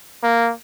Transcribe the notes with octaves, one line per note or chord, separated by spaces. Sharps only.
A#3